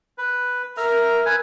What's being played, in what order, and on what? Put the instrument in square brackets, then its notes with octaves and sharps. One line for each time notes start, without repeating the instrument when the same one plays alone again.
[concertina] B4
[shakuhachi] A#4 [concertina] E5 A#5 F6
[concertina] B4 G#5